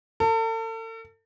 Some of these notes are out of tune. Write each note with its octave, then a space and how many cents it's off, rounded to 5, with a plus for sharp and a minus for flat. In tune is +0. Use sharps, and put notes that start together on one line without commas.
A4 +40